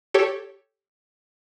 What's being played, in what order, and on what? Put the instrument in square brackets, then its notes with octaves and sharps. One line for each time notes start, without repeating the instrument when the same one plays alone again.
[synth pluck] G4 A4 C#5